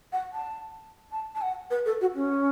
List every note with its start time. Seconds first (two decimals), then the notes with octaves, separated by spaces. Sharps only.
0.12 F#5
0.32 A5
1.11 A5
1.35 A5
1.42 F#5
1.70 B4
1.85 A4
2.01 F#4
2.15 C#4